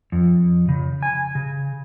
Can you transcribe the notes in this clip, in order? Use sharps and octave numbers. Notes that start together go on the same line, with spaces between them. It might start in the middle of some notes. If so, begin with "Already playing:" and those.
F2
C#3
G#5
C#3